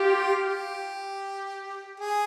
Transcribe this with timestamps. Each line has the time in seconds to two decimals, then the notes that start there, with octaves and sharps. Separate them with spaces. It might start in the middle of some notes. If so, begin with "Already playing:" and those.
Already playing: F4 G4
0.44 G4
2.00 G#4